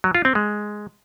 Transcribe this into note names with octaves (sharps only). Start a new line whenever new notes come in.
F#3
F4
C4
G#3